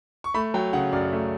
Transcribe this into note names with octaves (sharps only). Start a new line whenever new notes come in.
C#6
A3 B5
F#3 G5
C#3 F#5
F#2 D5
A3